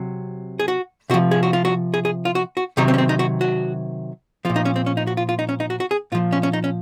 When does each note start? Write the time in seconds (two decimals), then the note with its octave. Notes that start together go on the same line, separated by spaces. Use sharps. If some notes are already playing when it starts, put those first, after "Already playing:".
Already playing: C3 F#3
0.59 G#4
0.68 F#4
1.10 C3 F#4
1.14 F3
1.31 G#4
1.43 F#4
1.53 F4
1.65 F#4
1.94 G#4
2.05 G#4
2.25 F4
2.35 F#4
2.57 F#4
2.77 C3 D#3 F#3 D#4
2.88 C4
2.94 C#4
2.98 C4
3.09 D#4
3.19 F#4
3.41 F#4
4.45 F3 F4
4.50 A#2
4.56 D#4
4.65 C#4
4.76 C4
4.86 C#4
4.97 D#4
5.07 F#4
5.17 F4
5.29 F4
5.39 D#4
5.49 C#4
5.60 D#4
5.70 F#4
5.80 F#4
5.91 G#4
6.12 A#2 F3 F4
6.32 C#4
6.43 C#4
6.53 D#4
6.64 C#4